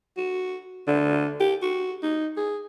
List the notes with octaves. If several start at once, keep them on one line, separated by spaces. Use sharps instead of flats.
F#4
D3
G4
F#4
D#4
G#4